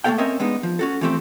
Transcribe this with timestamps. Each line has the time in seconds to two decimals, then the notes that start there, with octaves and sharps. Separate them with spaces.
0.04 A3 A#3 C4 A4 F5 G5
0.18 C4 C#4 A#4 C#5 D#5 E5
0.40 G#3 B3 D4 D#4
0.63 F3
0.79 C#4 F#4 A4
1.01 E3 F3 A3 C4 G4